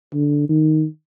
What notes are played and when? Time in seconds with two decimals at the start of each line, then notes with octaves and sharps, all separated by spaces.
0.14 D3
0.49 D#3